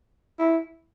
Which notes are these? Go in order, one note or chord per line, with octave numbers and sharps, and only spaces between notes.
E4